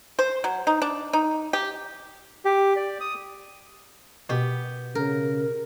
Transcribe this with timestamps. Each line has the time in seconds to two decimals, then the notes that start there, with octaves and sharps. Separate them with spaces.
0.19 C5
0.44 F#3
0.67 D#4
0.82 D4
1.13 D#4
1.53 G4
2.45 G4
2.76 D5
3.00 D#6
4.29 B2 B3 G4
4.95 C#3 A#4